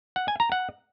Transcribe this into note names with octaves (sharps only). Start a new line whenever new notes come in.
F#5
G#5
A#5
F#5